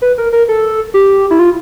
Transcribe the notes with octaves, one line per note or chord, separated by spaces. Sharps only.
B4
A#4
A#4
A4
G4
E4
F4